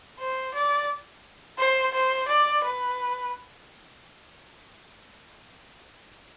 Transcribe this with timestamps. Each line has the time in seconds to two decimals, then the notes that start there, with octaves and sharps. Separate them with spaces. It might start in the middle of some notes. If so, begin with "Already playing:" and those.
0.20 C5
0.54 D5
1.58 C5
1.94 C5
2.28 D5
2.64 B4